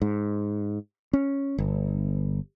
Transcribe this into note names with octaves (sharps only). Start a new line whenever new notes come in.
G#2
C#4
G1